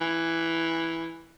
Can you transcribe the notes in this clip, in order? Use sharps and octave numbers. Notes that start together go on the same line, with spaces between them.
E3